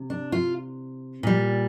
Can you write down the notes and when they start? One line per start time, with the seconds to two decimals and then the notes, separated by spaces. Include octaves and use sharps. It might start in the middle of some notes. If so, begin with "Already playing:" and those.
Already playing: C3
0.10 D4
0.32 F4
1.23 A#2 G3